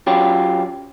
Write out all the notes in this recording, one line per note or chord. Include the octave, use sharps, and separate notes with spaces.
F#3 C#4 F4 G4